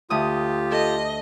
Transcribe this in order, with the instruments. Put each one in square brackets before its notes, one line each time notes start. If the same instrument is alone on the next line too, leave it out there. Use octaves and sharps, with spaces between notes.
[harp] D2 D#6 [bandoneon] F4 G4
[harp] A4 [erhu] D#5